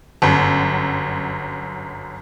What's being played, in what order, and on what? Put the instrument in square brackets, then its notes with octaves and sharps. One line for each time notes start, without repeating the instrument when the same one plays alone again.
[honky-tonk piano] G1 F#2